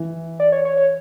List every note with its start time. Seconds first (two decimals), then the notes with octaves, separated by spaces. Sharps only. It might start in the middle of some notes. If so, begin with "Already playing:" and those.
Already playing: E3
0.40 D5
0.52 C#5
0.65 C#5
0.77 C#5